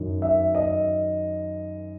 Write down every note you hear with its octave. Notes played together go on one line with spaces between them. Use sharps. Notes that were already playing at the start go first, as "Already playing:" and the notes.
Already playing: F#2 D#3
E5
D#5